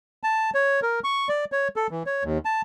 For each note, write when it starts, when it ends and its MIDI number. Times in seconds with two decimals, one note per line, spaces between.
0.24 0.50 81
0.54 0.80 73
0.82 1.00 70
1.04 1.28 85
1.29 1.45 74
1.52 1.68 73
1.76 1.87 69
1.91 2.03 52
2.06 2.24 73
2.24 2.38 39
2.45 2.62 81